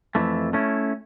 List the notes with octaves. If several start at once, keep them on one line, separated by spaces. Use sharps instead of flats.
F2 E3 A3
A3 C#4 E4